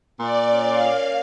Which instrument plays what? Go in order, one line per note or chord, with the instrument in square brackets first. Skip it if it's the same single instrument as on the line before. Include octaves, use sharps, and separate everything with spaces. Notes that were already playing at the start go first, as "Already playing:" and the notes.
[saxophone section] A#2 [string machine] D5
[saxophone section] C#4
[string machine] F5
[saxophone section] A#3